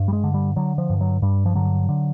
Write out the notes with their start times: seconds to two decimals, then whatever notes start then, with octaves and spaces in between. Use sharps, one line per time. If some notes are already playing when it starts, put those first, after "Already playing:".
Already playing: G2
0.08 G3
0.13 G#3
0.24 D3
0.34 G3
0.56 D3 F#3
0.78 F3
0.90 G2
1.01 F#3
1.22 G2 G3
1.46 F3
1.55 D3 F#3
1.89 D3